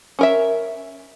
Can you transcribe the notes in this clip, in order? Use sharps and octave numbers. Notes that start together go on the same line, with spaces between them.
C#4 A#4 E5